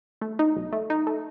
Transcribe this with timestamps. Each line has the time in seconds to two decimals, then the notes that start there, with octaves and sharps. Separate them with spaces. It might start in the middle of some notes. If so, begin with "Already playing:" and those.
0.21 A3
0.39 D#4
0.56 B1
0.73 A3
0.90 D#4
1.07 A3